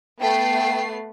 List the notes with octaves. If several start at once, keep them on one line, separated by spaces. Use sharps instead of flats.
A3 B3 G5 C7